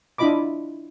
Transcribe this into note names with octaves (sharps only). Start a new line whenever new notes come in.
D4 E4 F4 D#5 B5 D6